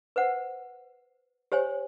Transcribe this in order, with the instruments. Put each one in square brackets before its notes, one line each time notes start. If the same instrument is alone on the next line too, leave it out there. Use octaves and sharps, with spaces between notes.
[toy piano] B4 C5 F#5
G4 C5 C#5 G#5